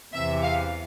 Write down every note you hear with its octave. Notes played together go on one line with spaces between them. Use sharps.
E2 C3 E3 E5
F5